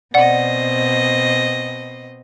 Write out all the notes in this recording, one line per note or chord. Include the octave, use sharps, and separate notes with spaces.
B2 C4 D5 D#5 F#5